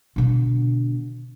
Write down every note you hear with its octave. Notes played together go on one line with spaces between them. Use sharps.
B2 D3